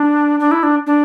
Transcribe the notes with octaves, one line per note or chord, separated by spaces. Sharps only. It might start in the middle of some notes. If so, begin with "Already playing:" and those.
Already playing: D4
D4
E4
D4
D4